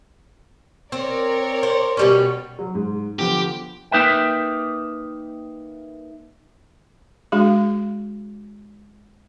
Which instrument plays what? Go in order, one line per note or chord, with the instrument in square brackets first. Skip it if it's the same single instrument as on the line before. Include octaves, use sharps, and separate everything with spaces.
[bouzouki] C4 [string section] A#4 C#5 D5
[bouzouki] C5
B2 G3 C#4
[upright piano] F#3
G#2
[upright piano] D3 F3 B3 [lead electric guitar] G4
[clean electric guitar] A#3 D#4 B4 E5 G5
[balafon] G#3 D4 F#4 G#4